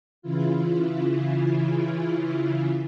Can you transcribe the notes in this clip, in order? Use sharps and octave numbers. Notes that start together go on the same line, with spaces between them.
C#3 E3 E4 F4